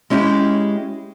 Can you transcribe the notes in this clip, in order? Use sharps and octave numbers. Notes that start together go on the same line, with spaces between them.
G#3 C#4 E4 G4